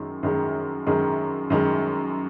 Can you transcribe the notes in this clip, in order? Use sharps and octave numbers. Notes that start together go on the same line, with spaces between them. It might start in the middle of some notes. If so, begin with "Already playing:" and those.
Already playing: F#2 D#3 G#3
F#2 D#3 G#3
F#2 D#3 G#3
F#2 D#3 G#3